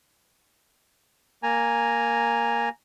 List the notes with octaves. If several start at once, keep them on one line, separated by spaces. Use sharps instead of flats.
A#3 G#5 A#5